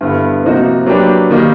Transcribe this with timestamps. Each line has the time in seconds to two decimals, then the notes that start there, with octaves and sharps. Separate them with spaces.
0.01 G2 D3 G3 B3 E4
0.43 C3 F3 A#3 D#4 F#4
0.86 F#3 A#3 D4 G4 B4
1.31 D#3 G3 A#3 D#4